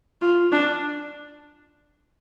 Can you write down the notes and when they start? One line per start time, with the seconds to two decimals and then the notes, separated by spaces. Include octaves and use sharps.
0.22 F4
0.52 D4